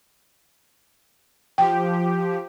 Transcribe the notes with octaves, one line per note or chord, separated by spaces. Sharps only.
F3 G4 G5